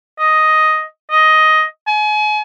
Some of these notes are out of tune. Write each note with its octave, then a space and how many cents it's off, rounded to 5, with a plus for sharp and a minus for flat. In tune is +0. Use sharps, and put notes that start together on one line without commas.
D#5 +5
D#5 +10
G#5 +35